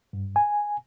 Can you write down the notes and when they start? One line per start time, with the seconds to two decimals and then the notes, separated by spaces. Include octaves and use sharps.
0.13 G2
0.36 G#5